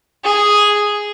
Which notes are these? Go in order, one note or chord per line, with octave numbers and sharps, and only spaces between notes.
G#4